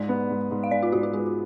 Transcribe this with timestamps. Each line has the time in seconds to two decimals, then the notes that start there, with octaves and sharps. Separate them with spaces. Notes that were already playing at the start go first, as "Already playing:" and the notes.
Already playing: G#2 D5
0.09 B3
0.30 G#2
0.51 G#2
0.64 F5
0.71 G#2 D5
0.83 F4
0.92 G#2 F#4
1.03 F4
1.13 G#3 F4